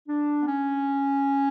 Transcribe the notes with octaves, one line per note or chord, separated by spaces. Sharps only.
D4
B3
C#4